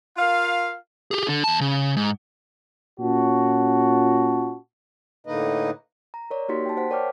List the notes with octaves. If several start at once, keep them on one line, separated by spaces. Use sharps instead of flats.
F4 A#4 F5
G4 G#4
D3
E2 A5
C#3
G#2
A#2 C#4 F4 F#4 C#5 A5
A2 D3 A#3 D#4 B4 D#5
A#5
A#4 C#5 D5
A#3 D#4 F#4 G4 C6 B6
G5 A5
C5 F#5 B6
A#4 C#5 D5 G5 D6 F6